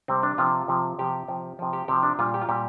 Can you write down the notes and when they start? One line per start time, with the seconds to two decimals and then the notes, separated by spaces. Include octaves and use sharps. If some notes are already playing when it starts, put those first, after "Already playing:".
0.08 C3 G3 C4
0.23 D4
0.38 C3 F3 F4
0.68 C3 F3
0.99 C3 F3 G4
1.28 C3 F3
1.59 C3 F3
1.73 G4
1.88 C3 F3 G4
2.03 D4
2.19 A#2 G3 F4
2.34 G4
2.41 F4
2.49 A#2 G3 G4